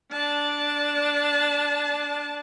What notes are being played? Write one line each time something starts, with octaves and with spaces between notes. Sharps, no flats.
D4 A5